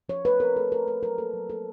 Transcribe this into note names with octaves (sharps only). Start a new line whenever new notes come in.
F3 C#5
A3 B4
C4 A#4
A3 A4
A3 A#4
A3 B4
F#3 A#4
A#3 A4
F#3
A#3 A4